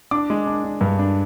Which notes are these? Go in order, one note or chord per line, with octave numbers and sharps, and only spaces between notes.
D4 D6
G#3
D4
D4
G2
D4